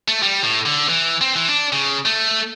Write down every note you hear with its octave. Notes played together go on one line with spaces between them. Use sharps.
A3
G3
A2
D3
E3
C4
E3
D4
C#3
A3